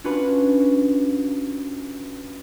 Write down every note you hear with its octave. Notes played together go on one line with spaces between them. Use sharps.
C#4 D4 F4 F#4 B4 B5